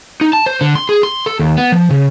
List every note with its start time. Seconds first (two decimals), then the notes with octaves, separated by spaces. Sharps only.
0.21 D#4
0.33 A5
0.46 C5
0.61 D3
0.75 C6
0.89 G#4
1.03 C6
1.26 A4
1.39 D#2
1.58 B3
1.72 F3
1.91 C#3